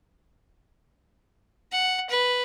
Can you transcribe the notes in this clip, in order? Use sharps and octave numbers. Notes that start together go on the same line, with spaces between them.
F#5
B4